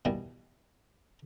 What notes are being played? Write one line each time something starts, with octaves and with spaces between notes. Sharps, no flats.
B2 D#3 E3 G3